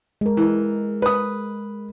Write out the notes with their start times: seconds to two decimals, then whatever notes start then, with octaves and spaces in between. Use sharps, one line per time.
0.21 G#3 A#4
0.37 E3
1.02 B4 D#6